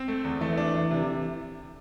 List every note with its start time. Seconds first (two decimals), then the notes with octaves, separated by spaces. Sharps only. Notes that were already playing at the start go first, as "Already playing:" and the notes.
Already playing: C4
0.08 A3
0.24 E2
0.41 E3 A3
0.58 D4
0.74 D4
0.91 C3